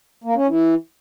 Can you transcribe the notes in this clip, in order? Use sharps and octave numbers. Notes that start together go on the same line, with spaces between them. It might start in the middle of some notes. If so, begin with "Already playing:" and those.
A#3
C#4
E3